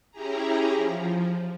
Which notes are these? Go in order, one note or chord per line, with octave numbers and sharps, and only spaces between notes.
C#4 E4 G4 G#4 A#5
F3